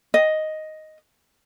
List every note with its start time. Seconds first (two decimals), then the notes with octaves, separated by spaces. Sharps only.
0.14 D#5